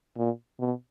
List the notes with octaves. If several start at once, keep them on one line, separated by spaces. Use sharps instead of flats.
A#2
B2